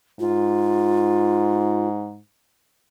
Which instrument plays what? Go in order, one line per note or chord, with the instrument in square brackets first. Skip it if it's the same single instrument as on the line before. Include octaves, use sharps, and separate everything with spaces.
[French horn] G#2 [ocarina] F4